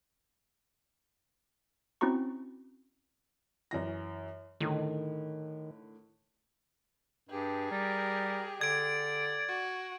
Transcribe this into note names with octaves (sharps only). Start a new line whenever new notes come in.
C4 C#4 E4 F#4 A#5 C#6
F#2 E3 A#6
A2 D3 D#3
G2 G4 G#4
G3 A#4
D3 D5 G#6 D7
F#4